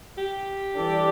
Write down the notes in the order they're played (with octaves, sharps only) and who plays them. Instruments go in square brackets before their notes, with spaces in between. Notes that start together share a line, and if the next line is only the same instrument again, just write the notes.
[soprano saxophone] G4
[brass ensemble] E3 G3 D4 A4 D5